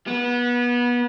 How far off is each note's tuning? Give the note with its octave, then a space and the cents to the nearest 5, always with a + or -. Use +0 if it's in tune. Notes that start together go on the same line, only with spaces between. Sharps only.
B3 -25